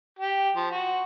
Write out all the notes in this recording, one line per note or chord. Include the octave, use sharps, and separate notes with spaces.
G4
F3
F#4